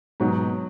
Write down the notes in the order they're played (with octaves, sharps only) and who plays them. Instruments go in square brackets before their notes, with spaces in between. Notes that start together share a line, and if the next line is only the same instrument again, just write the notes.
[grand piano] G#2 B2 [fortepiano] F#3